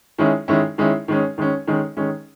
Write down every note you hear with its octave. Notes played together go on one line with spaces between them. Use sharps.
D#3 G#3 C#4 E4
D#3 G#3 C#4 E4
D#3 G#3 C#4 E4
D#3 G#3 C#4
D#3 G#3 C#4
D#3 G#3 C#4
D#3 G#3 C#4